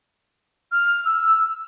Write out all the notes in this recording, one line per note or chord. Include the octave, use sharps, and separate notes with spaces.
F6
E6